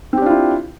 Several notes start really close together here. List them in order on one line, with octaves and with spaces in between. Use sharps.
C4 G4 D4 F4 E4